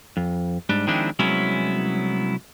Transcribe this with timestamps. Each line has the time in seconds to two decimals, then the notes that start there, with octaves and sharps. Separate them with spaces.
0.17 F2
0.69 G#2 G3 D4
0.87 D#3 F3 G#3 C4 D4 E4
1.19 C2 F#3 G#3 B3 C#4 E4